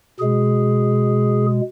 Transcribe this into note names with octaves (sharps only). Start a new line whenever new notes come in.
B2 G#3 G#4